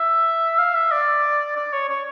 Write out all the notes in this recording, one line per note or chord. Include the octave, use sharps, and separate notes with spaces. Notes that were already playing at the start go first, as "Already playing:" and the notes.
Already playing: E5
F5
E5
D5
D5
C#5
C#5